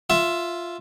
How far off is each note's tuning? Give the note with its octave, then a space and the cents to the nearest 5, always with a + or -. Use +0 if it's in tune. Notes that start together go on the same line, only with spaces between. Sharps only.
F4 +0 E5 +10